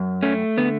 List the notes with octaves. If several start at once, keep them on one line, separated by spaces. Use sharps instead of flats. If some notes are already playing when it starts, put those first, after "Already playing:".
Already playing: F#2
A3 C#4
D3 B3